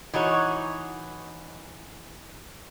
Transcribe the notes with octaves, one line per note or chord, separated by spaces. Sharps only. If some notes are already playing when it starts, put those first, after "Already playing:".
E3 D#4 F#4 C#5